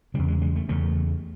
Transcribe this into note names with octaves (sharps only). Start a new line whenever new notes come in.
E2 C#3 G3
G#3
G#3
A3
E2 C#3 A3